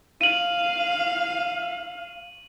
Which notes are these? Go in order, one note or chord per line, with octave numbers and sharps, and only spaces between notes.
F5 D#7 F#7